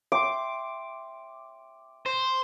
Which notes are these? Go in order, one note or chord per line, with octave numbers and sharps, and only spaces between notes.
E5 G5 C6 D6
C5